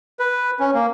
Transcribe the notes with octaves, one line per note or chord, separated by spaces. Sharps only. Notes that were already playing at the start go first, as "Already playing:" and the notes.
B4
C#4
A#3